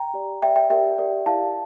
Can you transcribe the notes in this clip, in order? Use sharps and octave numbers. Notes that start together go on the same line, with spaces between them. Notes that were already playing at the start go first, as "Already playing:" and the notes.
Already playing: G5 A#5
G4 D5
G4 D5 E5 G5
E5 G5
G4 A#4 D5 E5 G5
G4 A#4 D5
E4 G4 D5 F5 A5